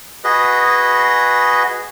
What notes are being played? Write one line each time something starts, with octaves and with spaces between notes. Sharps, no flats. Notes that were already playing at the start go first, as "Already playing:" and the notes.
F#4 G#4 B4 D#5